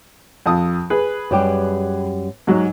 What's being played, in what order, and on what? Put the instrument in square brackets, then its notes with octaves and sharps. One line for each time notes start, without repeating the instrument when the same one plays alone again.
[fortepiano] F2 A5 D#6
G#4 B4
[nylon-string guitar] F#2 G3 G4
[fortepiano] G#2 F#3